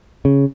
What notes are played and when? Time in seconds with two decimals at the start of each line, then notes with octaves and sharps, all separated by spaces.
0.25 C#3